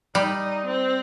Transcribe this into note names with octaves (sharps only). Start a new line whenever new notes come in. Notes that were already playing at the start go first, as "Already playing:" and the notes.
G3 D#4
C4